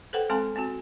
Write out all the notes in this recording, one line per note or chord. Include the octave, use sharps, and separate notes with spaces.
A4 B4 C5 F#5 G5
G#3 C4 A4 G#5 C6
B3 C4 F#4